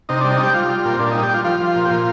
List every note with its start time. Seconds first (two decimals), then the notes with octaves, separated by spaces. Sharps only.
0.09 C3 D#4
0.21 G3 D4
0.32 D#4
0.40 G3 G4
0.54 G3 F4
0.69 G3
0.85 A#2
0.93 C4
0.99 A#2 D4
1.11 G3 D#4
1.23 G4
1.29 G3 F4
1.44 F3 F4
1.60 F3
1.76 A#2
1.85 G4
1.90 A#2 F4